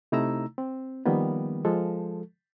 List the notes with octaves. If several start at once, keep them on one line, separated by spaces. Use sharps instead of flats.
C3 A3 D#4 E4 A#5 E6
C4
D#3 F3 G3 A#3 B3
F3 G#3 A4